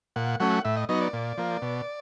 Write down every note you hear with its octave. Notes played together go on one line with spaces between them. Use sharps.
A#2 F#5
F#3 A3 C#4 F#5
A2 E5
D#5
F#3 B3 D#4 D#5
D5
A#2
F3 A#3
B2